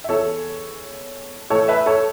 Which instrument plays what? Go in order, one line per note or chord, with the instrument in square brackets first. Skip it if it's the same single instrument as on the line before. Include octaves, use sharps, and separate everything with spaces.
[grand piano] E5
E2 E3 A4 C#5
A2 E3 A4 C#5
B4 E5
A4 C#5